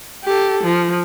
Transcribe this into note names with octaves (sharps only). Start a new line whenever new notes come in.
G4 A4
F3